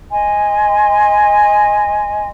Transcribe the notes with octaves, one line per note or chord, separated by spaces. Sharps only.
D#5 G#5 C6